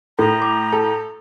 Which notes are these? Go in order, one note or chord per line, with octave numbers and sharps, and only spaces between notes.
A2 A4 A#5
D6
A4